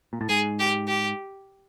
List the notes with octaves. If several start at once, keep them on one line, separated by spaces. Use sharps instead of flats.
A#2
A2
G#2 G#4
G4
G4